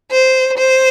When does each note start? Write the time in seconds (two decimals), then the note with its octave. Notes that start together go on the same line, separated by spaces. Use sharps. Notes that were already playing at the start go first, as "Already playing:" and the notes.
0.10 C5
0.56 C5